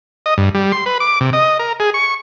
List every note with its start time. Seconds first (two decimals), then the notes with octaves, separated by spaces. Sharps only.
0.26 D#5
0.38 G2
0.55 G3
0.72 C6
0.86 B4
1.00 D6
1.21 C3
1.33 D#5
1.59 A#4
1.80 G#4
1.94 C#6